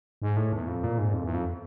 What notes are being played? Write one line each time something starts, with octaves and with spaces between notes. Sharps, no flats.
G#2
A2
E2
F2
A#2
G#2
F2
E2
F2